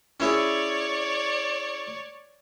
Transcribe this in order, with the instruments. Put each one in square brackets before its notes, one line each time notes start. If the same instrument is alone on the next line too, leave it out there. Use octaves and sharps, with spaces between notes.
[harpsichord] C#4 E4 G#4 [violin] C#5 D5